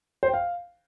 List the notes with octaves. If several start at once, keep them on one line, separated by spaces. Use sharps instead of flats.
C5
G5
F5